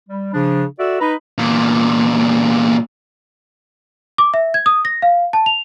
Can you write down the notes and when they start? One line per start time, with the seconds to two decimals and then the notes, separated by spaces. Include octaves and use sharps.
0.09 G3
0.33 C#3 F3 D4
0.79 F#4 A4 D5 E5 E6
1.00 D#4 B4 A#5 B5
1.38 E2 A#2
4.18 D6
4.34 E5
4.54 G#6
4.66 D#6
4.85 A#6
5.02 F5
5.33 A5
5.46 F7